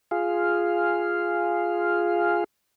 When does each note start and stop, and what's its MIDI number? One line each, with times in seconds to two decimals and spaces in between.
0.11 2.44 65
0.11 2.44 68
0.11 2.44 77